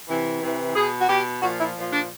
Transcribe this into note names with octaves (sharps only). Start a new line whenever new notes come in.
C3 E3
C3 E3
B2 G#4
F#4
B2 G4
A#2 F3 F#4
E4
A#2 F3
D4